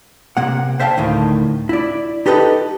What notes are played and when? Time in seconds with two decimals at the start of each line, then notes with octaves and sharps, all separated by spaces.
0.37 C3 A#3 F#5
0.80 C5 E5 F5 G5 A5
0.97 D2 A2 D#3
1.69 E4 D5
2.26 D#4 G4 A4 B4 D5 D#5